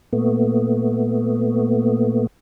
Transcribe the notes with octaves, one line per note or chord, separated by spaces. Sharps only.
A#2 A3 B3